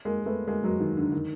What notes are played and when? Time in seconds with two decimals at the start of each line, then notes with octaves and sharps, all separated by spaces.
0.05 G#3 A#3
0.26 A3 B3
0.48 G#3 A#3
0.64 F#3 G#3
0.80 D#3
0.97 D3
1.12 D#3